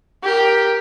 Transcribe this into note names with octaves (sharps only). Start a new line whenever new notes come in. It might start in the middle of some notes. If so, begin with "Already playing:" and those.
G4 A#4